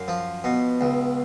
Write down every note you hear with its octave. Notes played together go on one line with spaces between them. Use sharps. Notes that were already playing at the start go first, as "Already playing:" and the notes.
Already playing: F#2 C#5 F5
F3
B2
C#2